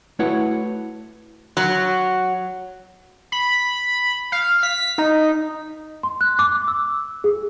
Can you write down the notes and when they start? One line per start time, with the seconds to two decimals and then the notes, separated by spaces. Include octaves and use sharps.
0.19 A3 E4 F#4 B4 C#5 F#5
1.57 F#3
3.32 B5
4.32 F5
4.63 B6
4.98 D#4
6.03 C6
6.21 F#6
6.39 D6
6.68 E6
7.24 G#4